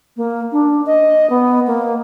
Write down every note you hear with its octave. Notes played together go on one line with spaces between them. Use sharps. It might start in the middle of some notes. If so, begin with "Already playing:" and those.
A#3
D4
D#5
B3
A#3